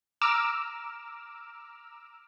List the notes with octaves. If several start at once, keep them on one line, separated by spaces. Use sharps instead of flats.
A#5 D6 E6 F6